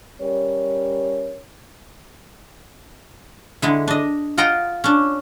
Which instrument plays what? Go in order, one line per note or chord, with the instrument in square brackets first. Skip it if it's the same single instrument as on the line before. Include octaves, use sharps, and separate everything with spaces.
[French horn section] G3 C#4 A#4 C#5
[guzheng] D3 G#3 E4
D4 D#5
F4 D#5 F#5 G5 A#5
C#4 D4